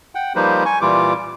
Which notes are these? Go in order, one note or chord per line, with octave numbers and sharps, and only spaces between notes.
F#5 G5
F3 G3 A#3 D#4 B4 C5
G#5 C#6
A#2 E3 G3 F4 D6